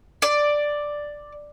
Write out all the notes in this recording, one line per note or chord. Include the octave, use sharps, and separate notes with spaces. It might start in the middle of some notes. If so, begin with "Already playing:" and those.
D5